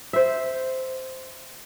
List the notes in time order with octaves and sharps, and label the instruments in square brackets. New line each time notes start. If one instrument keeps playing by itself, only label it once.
[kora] C5 E5